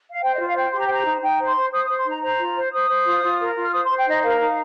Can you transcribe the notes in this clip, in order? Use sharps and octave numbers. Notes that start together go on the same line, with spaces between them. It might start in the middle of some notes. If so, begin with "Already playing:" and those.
F5
C5 G5
D#5
F4
F5
C5 G5
G4 C6
A#5
C5 G5
A#5
D#4
D#4 G5
C5
C6
C5
C5 D#6
D#6
C5
C6
D#4 A#5
C5 A#5
F4
C5
C5 D#6
C5
F4
F4
A#4
F4
F6
C5 D#6
C6
C5
G5
D#4 D#5
A#4 F5
D#4